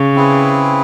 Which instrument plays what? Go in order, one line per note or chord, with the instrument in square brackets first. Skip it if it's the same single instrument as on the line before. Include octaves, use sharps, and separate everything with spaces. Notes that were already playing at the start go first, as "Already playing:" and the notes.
Already playing: [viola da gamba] C#3
[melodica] C4 E4 G#4 B4